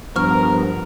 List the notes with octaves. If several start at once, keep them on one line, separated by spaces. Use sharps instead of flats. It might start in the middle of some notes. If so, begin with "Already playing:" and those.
G2 F3 B3 A#4 C#6 F6